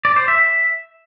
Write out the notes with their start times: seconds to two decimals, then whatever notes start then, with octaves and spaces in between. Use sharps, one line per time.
0.05 D5
0.16 C5
0.28 E5